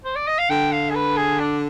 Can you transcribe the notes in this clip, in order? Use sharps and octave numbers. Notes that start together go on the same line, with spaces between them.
C5
D5
D#5
F5
D3 G5
F5
G#4
B4
G#4
D4